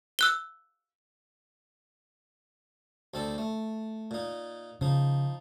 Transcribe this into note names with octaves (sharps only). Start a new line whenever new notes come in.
E6 F#6 G7
D2 C4 A4
A3
A#2 D#4
C#3 F3 D#4